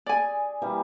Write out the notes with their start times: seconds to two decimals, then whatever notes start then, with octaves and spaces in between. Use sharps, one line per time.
0.06 G#4 D5 G#5
0.62 E3 G3 A#3